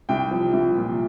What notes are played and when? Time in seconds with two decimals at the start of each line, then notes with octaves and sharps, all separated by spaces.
0.09 C2 G5
0.31 F3
0.53 C2
0.76 A#2